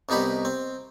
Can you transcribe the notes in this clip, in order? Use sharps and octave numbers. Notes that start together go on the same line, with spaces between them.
C2 B2 D#4 G4 B5
C4